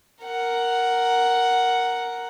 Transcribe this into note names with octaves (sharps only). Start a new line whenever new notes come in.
A#4 F#5